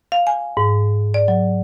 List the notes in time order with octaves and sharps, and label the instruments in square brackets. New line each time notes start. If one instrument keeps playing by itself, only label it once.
[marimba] F5
G#5
G#2
D5
F#3